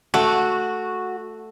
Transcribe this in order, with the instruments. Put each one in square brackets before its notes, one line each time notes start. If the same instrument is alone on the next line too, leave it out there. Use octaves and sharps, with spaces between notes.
[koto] A3 [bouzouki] F#4